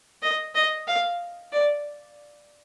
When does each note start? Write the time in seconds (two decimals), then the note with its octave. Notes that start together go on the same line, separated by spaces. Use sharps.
0.22 D#5
0.55 D#5
0.87 F5
1.53 D5